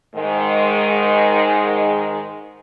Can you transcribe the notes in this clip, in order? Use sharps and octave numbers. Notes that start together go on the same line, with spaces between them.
G#2 D#3 G#3